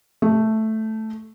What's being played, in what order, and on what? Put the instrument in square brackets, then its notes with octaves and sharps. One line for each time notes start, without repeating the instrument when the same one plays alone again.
[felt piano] A3